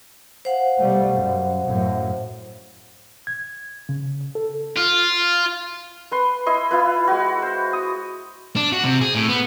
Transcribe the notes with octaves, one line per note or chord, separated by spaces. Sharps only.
C5 F5 F#5
B2 G3 A3
F#2
F#2 A2
G#6
C#3
A4
F4
B4 C6
E4 D#5 C6
E4 F4 B4
G#3 F#4
C5
D#6
D4
F#4
C3
G#4
A2
B3